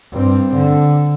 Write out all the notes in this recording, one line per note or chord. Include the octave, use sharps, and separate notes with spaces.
G2 C4
D3